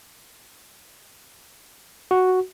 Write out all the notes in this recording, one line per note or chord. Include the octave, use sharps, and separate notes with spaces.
F#4